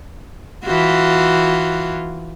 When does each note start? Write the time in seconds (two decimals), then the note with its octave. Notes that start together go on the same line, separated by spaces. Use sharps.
0.64 E3 F4 F#4